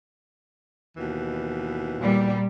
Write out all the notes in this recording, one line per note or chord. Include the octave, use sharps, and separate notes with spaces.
D#2 B2 E3
A#2 G3